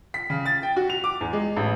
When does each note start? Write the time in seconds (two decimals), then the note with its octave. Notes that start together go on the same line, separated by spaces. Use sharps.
0.14 B6
0.30 C#3
0.46 A6
0.63 G5
0.76 F#4
0.90 F7
1.04 D6
1.21 E2
1.33 G#3
1.57 A1